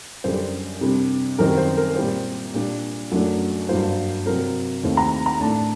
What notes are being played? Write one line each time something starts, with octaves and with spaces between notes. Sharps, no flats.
F#2 D3 G3 C5
C3 G3 D4
F#2 D#3 G3 C4 A#4
C5
A#4
A#2 G3 C4 C5
A#2 G3 D4
F#2 F#3 A3 D4
G2 F#3 A#3 C5
C3 F#3 C4 A#4
D#2 D#3 A3 C4
A#5
A#5
A2 A3 D4 A5